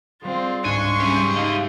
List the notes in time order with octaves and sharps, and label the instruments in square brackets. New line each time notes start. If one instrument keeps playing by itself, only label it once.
[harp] G3 G#4 [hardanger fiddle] C4 F4
[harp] C#2 G#2 [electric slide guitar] D4 [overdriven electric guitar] G#5 [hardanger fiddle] C6 C#6
[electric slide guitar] G3 C#4 [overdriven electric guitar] G4 G#5 [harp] C5 E5
[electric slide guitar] D#4 D#5 F5